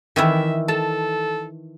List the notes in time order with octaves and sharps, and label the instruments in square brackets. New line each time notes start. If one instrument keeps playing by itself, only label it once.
[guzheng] D#3 E3 E4 [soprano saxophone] E5
[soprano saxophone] A4 [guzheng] A5